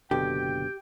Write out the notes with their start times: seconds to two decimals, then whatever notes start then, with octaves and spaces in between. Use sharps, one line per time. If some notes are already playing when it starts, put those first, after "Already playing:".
0.11 F#1 B2 D3 G4 G5